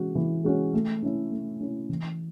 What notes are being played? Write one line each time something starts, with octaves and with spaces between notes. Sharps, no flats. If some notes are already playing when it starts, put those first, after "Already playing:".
Already playing: E3 G#3 C#4 F#4
E3
G#3 C#4 F#4
A3
C#4 E4
A3
C#4 E4
E3